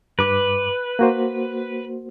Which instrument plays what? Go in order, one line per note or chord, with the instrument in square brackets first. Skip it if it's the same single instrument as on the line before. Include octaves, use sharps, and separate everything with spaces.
[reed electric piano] G2 D6 [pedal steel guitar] B4
[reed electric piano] A#3 F#4 C5